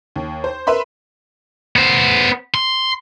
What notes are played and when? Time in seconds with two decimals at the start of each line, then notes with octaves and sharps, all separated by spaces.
0.16 D#2
0.44 C5
0.67 A#4 B4 E5 B5 C6
1.76 B3 C5
2.55 C6